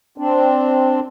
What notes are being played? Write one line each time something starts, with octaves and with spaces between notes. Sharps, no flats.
C4 D4